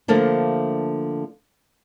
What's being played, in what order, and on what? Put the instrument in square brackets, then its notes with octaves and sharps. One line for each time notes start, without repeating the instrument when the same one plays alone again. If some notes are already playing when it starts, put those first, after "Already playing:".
[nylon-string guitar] D3 F3 A3 A#3 D4